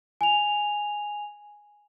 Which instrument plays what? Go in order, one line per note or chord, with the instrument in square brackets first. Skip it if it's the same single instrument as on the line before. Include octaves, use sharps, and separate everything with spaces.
[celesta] G#5 F7